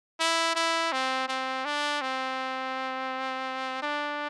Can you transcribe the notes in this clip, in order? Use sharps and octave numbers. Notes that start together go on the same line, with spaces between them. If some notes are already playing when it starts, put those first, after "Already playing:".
E4
E4
C4
C4
D4
C4
D4